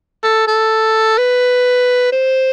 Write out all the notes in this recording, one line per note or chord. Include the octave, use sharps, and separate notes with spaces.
A4
A4
B4
C5